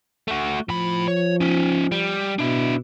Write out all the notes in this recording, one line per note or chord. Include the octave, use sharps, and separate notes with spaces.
A3 F#4
A2 F3 B5
C#5
C#4 D#4
G3
B2 D4 E4